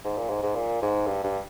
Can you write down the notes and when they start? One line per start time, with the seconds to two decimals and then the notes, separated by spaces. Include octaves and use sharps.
0.04 G#2
0.18 A#2
0.30 G#2
0.43 G#2
0.55 A#2
0.82 G#2
1.07 G2
1.24 G2